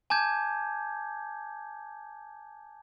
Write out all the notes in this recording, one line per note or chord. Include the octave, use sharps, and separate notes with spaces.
G#5 A5 D6 G6 G#6